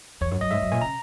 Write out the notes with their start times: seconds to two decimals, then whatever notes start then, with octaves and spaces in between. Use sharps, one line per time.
0.21 E2 C#5
0.31 F#2
0.41 F#2 D#5
0.51 G#2 E5
0.62 F#2
0.72 A#2 G#5
0.81 C#3 A#5